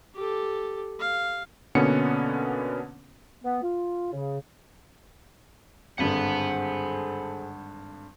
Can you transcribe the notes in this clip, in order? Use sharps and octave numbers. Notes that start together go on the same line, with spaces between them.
G4 A4
F5
B2 D3 A#3 B3 C#4 C#7
B3
F4
C#3
G#1 G2 D3 G#4 A4 C5 F#5 B5